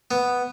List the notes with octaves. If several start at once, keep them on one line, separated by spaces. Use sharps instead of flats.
B3